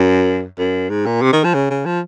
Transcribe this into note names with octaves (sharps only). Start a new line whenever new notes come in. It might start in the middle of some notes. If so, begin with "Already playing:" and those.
Already playing: F#2
F#2
G#2
A#2
C3
D#3
F3
C#3
C#3
F3